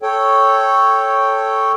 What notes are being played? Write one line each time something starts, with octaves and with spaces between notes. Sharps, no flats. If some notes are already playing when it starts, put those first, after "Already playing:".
A4 C#5 G5